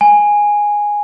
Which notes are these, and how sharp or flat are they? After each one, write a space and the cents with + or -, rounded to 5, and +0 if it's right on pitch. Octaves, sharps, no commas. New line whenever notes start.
G#5 -5